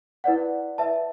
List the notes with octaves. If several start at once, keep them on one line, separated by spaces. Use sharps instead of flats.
E4 B4 D5 F#5
B4 E5 A5